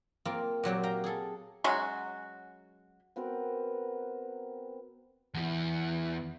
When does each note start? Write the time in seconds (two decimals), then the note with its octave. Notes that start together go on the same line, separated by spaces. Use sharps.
0.25 A#3 C4 F4
0.63 A#2 F#3 C4 G4
0.83 F5 G5 A#5
1.04 G#4 A4
1.64 F#3 G#3 C#4 F#4
3.16 B3 C4 F#4 A#4
5.34 E2 E3